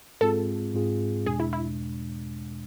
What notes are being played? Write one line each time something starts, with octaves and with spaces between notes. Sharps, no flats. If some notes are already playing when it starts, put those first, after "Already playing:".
G#2 G#3 C4 F4 G#4 A4
G#2 G#3 C4 F4 G#4
E2 B2 G#3 D4 G#4
E4
E4